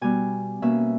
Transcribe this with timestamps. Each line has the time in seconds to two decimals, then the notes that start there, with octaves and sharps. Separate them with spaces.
0.01 B2 G3 B3 G#5
0.62 B2 A#3 C#4 E5